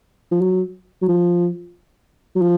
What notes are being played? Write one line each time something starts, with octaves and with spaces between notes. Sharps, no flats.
F3
F#3
F#3
F3
F#3
F3